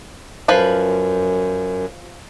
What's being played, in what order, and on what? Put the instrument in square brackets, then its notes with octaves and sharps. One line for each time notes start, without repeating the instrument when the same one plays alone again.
[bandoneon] F#2 [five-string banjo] F3 B4 F5